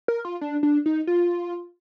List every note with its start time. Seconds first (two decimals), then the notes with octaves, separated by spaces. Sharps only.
0.08 A#4
0.25 F4
0.41 D4
0.63 D4
0.86 D#4
1.07 F4